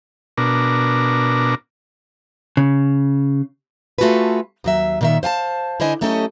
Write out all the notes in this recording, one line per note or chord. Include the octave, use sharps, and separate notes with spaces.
B2 D4 A#4
C#3
A3 F4 F#4 G#4 A4 B4
D#2 F#3 E5
A#2 D#3 E5
C5 F5 G#5 A5
D3 E4 C5 D#5 G#5
F#3 A3 C#4 G4 A4 D#5